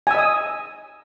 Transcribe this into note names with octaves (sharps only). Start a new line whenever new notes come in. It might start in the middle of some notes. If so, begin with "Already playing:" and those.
D#5 G#5 D#6 E6